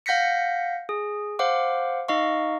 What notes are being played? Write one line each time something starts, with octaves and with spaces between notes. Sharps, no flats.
F5 F#5 G6 A#6 B6 C#7
G#4
C5 F5 F#5 D6
D#4 D#5 F5 C#6